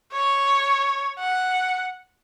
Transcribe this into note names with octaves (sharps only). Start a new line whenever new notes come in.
C#5
F#5